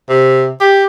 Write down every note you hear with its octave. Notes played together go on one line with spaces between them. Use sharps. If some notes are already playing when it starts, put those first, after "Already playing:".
C3
G4